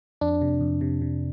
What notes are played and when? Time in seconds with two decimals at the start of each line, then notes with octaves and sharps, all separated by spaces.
0.21 F2 D4
0.42 C3
0.61 F2
0.81 C3
1.02 C3